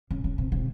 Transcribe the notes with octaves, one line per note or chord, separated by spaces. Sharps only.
C#3
C#3
C3
C3